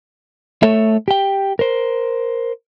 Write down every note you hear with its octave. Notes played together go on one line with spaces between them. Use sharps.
A3 A4 C#5 E5
G4 G5
A#4 C5